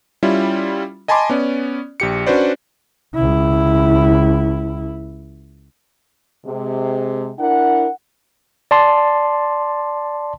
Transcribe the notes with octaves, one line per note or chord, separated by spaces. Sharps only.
G3 C#4 E4 F4
D#5 G#5 A5 B5 C6 D6
B3 C#4 D5
A#1 G4 C#7
C#4 D4 F#4 B4 C5 D5
C#2 E4
C3 G#3
D4 E4 A#4 F#5
D5 A5 C6